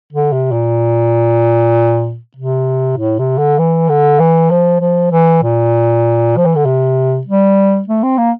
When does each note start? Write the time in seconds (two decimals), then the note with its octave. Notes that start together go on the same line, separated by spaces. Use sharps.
0.13 D3
0.33 C3
0.52 A#2
2.37 C3
2.97 A2
3.19 C3
3.38 D3
3.59 E3
3.89 D3
4.20 E3
4.51 F3
4.81 F3
5.12 E3
5.43 A#2
6.37 F3
6.46 E3
6.56 D3
6.66 C3
7.27 G3
7.88 A3
8.03 C4
8.18 A#3